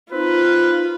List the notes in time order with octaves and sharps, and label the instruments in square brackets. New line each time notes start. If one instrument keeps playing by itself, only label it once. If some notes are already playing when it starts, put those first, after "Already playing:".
[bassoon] C4 [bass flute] D#4 [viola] F4 [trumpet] B4